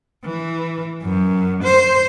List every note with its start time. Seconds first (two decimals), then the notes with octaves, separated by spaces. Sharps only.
0.24 E3
1.02 F#2
1.63 C5